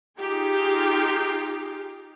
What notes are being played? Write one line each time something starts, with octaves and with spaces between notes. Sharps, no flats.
D#4 F4 G4 G#4